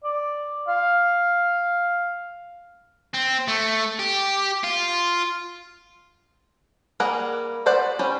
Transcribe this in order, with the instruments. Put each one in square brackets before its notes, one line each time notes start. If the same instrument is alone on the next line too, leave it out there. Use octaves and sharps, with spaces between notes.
[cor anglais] D5
F5
[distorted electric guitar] C4
A3
G4
F4
[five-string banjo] G3 A#3 G#4 A#4 F#5
B3 F#4 C5 D5 F#5
G3 C#4 C5